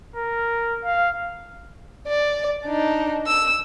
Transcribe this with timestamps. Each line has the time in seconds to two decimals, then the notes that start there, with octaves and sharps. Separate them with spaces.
0.16 A#4
0.85 F5
2.07 D5
2.66 D4 D#4
3.27 E6